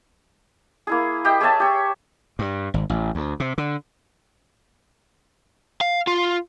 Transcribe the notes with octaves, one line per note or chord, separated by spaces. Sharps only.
A#3 E4 G#4
G4 D#5 E5 G5
G#4 C#5 E5 A5
G4 C#5
G2
G#1
A1
D2
C3
D3
F5
F4